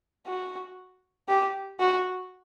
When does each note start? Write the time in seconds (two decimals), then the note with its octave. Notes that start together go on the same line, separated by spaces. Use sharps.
0.27 F#4
1.29 G4
1.80 F#4